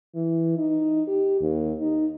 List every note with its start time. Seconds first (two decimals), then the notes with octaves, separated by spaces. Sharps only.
0.15 E3
0.57 D#4
1.07 G4
1.41 D#2
1.80 D#4